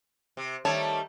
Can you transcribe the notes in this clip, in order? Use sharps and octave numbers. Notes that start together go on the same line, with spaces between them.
C3
D#3 G3 A3 C#5 A5